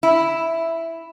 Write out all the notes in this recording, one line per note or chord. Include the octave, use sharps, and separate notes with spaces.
E4